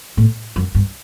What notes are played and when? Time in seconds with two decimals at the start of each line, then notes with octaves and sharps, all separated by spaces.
0.17 A2
0.56 F#2
0.75 G2